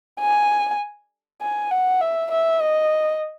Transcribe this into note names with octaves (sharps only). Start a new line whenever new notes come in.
G#5
G#5
F#5
E5
E5
D#5